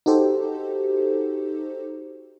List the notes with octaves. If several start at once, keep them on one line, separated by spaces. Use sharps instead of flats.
D#4 F#4 G4 A4 C5